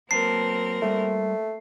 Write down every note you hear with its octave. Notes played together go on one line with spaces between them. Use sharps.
F#3 A#3 C4 A#4 B4 A5 C7
G3 A3 F4